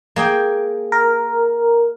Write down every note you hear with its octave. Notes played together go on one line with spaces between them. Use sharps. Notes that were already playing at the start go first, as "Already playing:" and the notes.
A#3 G#4 G5
A#4